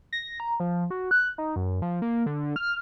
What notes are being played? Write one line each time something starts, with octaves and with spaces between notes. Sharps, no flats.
A#6
A#5
F3
F#4
F#6
D#4
F#2
F3
A#3
D3
F6